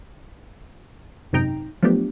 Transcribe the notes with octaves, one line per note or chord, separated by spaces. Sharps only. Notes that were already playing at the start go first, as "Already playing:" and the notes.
G#1 F#2 C3 D#4 G5 A#5
F3 F#3 A3 B3 D4 G4